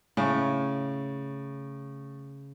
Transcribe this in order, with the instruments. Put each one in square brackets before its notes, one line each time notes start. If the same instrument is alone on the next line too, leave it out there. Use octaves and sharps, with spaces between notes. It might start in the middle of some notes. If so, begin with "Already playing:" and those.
[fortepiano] A2 [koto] C#3